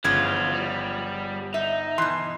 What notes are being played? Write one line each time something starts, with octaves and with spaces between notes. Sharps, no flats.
G1 C#3 E3 F3 F4 G#6
G3
D#4 E5
B2 E3 C6